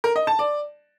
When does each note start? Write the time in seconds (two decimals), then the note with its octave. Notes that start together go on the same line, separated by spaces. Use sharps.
0.04 A#4
0.16 D#5
0.27 A5
0.39 D5